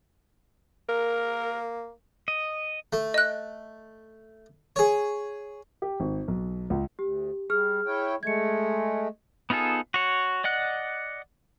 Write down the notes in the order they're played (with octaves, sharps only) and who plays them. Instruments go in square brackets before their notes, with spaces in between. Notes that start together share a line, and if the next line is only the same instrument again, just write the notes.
[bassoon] A#3 [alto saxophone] A#4
[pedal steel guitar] D#5
[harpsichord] A3
[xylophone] D#5 F#6
[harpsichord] G#4 C#5
[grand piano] G4
G#1
B1
C#2
[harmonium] D2 [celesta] G4
[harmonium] G3 [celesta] G#4 F6
[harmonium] E4 C#5 G5
[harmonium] G#3 A3 [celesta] G#6 C#7
[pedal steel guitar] B3 D#4 F4 G#4 A4
F#4 C#5
D5 D#5 F#5 F#6